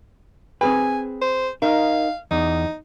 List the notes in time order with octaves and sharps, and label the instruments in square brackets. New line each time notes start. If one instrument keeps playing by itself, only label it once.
[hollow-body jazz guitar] C4 G#4 B4 [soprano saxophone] G#5
[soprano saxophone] C5
[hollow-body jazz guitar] D#4 A#4 [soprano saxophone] F5
[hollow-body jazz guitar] E2 [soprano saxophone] D#4